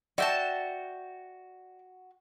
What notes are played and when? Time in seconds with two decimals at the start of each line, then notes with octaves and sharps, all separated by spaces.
0.18 F#4 D5 E5 G5 A5